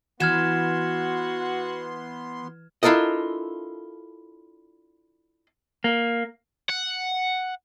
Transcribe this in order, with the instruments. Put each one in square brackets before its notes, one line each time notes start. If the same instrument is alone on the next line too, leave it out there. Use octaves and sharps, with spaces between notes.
[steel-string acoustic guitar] E3 [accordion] B3 C6 [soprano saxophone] F#4 [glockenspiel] F6 G#6 E7
[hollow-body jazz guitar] D4 E4 F4 A4 A#4 D#5
[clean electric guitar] A#3
[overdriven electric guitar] F#5